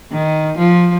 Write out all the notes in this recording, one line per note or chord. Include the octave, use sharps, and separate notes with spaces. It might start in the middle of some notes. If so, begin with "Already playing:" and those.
D#3
F3